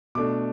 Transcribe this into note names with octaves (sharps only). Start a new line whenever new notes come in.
B2 A3 D4 D6